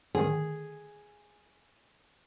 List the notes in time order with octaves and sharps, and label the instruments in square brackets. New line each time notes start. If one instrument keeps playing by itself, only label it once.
[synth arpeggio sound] D3 D#3 [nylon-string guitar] G#4